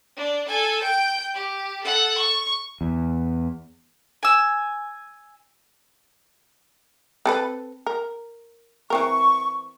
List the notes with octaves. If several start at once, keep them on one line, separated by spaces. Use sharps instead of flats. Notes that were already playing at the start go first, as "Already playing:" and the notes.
D4
A4 G#5
G5 G6
G4
A4 F#5
C#6
E2
G#5 E6
C4 A4 B4
A#4
E3 C4 A#4 C#6